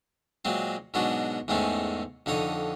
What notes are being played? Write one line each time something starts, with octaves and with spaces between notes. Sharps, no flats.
A#2 F#3 G#3 C4
G#2 B2 F#3 G#3 D4 F#4
E2 G#2 G#3 A3 C4 C#4
F2 D3 D#4 C#5 D#6